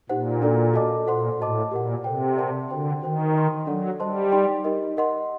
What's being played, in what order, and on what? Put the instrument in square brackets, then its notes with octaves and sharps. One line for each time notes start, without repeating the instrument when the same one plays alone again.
[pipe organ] A#2 [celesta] D#4 G4 C5 F#5
[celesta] D4 F#4 A4 D5
F#4 A4 D#5 A5 D6
[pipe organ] A#2 [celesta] A4 C5 F#5 C6
[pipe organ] A2 [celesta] F#4 C5 D#5 A5 D6
[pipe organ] A#2 [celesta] G4 A#4 F#5
[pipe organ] C3 [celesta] A4 C5 G5
[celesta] A#4 D5 F#5 A5 C6
[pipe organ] D3 [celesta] F#4 C5 G5 C6
[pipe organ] D#3 [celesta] F#4 C5 G5
[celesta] A#4 D#5 G5 C6
[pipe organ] F#3 [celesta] D4 A4 D5 F#5
[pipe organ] G3 [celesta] C5 D#5 A5 C6
[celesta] D#4 G4 D5 G5 C6
D#4 G4 A#4 D#5
A#4 D#5 F#5 C6